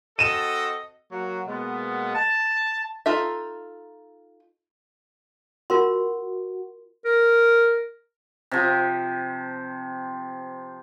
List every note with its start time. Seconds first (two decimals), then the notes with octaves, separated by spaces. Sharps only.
0.19 C4 F#4 A4 D#5 D#7 E7
1.12 F#3 A#3 F#4
1.48 B2 G#3 A#3 B3
2.15 A5
3.06 D#4 F4 A4 E5
5.70 F4 F#4 A#4 C6
7.05 A#4
8.52 C3 F3